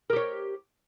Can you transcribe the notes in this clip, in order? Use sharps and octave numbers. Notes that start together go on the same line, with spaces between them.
G4 A#4 C#5